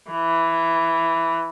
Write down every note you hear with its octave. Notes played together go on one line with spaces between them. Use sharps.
E3